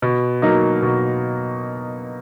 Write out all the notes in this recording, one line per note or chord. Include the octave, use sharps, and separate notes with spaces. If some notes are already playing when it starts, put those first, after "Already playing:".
B2
F#3 A#3 D#4
B2